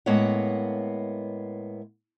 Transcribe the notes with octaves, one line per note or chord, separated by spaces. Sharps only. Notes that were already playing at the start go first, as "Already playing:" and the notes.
A2 G#3 A#3 B3 C#5 F#5